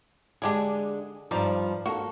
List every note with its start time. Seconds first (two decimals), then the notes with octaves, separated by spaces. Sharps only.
0.42 D3 G#3 D4 G4 G#4
1.31 G2 F3 G3 D#4 D5
1.86 A#3 F#4 A4